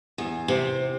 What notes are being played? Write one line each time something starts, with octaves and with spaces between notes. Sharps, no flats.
E2
C3